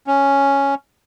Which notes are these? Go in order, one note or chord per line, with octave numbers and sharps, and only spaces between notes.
C#4